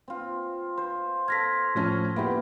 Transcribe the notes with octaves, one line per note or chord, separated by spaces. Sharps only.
C4 F4
C5
A4 F5 G#6 A#6 B6
A2 F3 C#4
A#2 A#3 B3 E4 G4